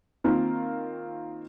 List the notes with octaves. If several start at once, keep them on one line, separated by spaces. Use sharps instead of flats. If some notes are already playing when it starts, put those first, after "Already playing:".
D#3 A#3 C4 F4 A#4